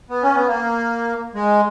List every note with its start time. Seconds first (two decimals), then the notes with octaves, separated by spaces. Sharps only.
0.10 B3
0.23 C#4
0.35 B3
0.47 A#3
1.35 G#3